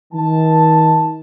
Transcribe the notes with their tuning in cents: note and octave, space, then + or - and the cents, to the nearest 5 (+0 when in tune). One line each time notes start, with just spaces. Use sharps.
D#3 +40 A5 +0